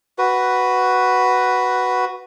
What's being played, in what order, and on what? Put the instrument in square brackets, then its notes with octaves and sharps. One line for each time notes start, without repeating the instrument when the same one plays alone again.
[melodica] F#4 B4